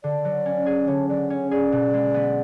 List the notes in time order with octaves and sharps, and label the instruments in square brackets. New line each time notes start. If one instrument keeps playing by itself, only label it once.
[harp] D3 [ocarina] D5
[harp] F#3
C#4
G#4
[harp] D3 [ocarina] C#5
[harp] F#3 [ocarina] D5
[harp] C#4 [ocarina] C#5 D5
[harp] G#4 [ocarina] D5
[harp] B2
G#3
B3